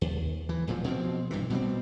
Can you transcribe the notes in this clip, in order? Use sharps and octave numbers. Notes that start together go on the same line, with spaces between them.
D#2
E3
D1 A#2 F3
B2 F3 C4
A#1 G2 C3 E3
B2 G3 G#3 C4